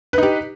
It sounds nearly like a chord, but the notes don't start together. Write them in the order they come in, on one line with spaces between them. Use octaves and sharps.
B4 D#4 G4